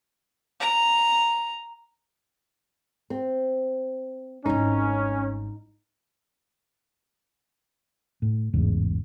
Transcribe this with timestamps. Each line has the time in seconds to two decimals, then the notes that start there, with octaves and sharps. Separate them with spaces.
0.60 A#5
3.10 C4
4.46 G#1 G3 C#4 D#4
8.22 A2
8.53 A1 E2 G#2 C#3